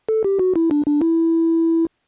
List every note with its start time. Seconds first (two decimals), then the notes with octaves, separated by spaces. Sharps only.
0.09 A4
0.24 G4
0.39 F#4
0.56 E4
0.71 D4
0.86 D4
1.02 E4